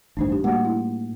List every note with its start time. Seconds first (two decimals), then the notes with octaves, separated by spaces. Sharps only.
0.17 A1 D2 G2 D4 D#4 C5
0.30 D4 G4
0.44 A2 G3 A#3 F#4 F#5
0.65 E4